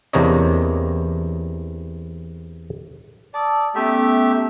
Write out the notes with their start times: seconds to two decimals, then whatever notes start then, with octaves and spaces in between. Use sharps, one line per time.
0.13 E2 C3 A#3 D4 C#5 D#5
3.34 D5 A5 D#6 E6
3.75 A3 B3 C#4 G4 E5 A#5